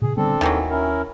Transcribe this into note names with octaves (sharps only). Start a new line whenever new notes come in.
A#2 C#3 G#4
D3 G3 B3 C4 D4 A4
D#2 D#3 E3 F#3
C#4 E4 A#4